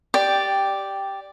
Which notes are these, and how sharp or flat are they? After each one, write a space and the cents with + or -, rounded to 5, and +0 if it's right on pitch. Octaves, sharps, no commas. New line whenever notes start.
G4 +0 D5 +0 G5 +5